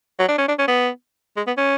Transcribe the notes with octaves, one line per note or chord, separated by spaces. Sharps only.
F#3
D4
C#4
D4
C#4
B3
G#3
B3
C#4